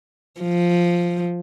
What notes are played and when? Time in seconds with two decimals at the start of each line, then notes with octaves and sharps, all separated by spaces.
0.41 F3